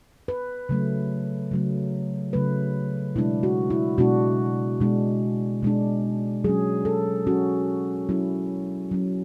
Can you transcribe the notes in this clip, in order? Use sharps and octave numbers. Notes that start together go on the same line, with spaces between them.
B4
C#3 F#3 A3
C#3 F#3 A3
C#3 F#3 A3 B4
B2 G#3 D4 E4
F#4
E4
B2 G#3 D4 F#4
B2 G#3 D4
B2 G#3 D4
F#3 C#4 G#4
A4
F#3 C#4 F#4
F#3 C#4 E4
F#3 C#4